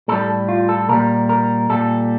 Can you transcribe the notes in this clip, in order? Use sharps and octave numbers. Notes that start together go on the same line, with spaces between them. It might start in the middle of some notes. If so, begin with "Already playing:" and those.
A2 G3 A4
F4
A4
A#2 G3 A#4
A#4
A#2 G3 A4